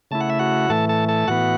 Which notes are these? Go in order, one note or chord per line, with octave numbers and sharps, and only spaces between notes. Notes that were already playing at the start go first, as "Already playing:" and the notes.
C#3 A3 E4 A5
F#5
E5
F#4 F#5
A2 E3 A3 A4 A5
A4 A5
A4 A5
A2 E3 B3 F#4 F#5